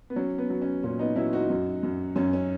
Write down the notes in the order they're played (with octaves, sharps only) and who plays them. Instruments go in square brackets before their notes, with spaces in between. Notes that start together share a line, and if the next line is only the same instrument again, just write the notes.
[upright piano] B3
F#3 C#4
B3
F#3
C#4
A#2 C#4
B3 D#4
F#3 C#4 E4
D#4 F#4
F#2
F#2
F#2 C#4
C#4